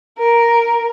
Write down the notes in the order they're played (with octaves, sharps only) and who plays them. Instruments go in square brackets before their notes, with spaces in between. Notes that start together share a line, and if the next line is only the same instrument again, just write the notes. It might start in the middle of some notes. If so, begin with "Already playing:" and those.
[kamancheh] A#4